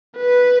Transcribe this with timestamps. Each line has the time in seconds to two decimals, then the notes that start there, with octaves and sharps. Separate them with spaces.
0.18 B4